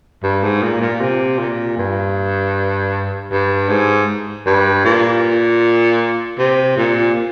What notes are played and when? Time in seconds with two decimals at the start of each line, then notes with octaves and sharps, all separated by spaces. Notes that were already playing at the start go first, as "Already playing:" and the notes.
0.23 G2
0.43 G#2
0.62 A#2
0.81 A#2
1.01 C3
1.39 A#2
1.77 G2
3.31 G2
3.69 G#2
4.46 G2
4.85 A#2
6.38 C3
6.77 A#2